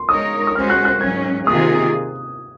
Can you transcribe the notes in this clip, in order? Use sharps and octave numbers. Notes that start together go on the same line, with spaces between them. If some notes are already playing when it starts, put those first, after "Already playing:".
Already playing: C6
G#3 D#4 A#4 C#5 D#6
D#6
G#3 C#4 F#4 C5 F6
F#6
F#6
G#2 F#3 C#4 G#6
C3 D#3 A#3 F4 G#4 D#6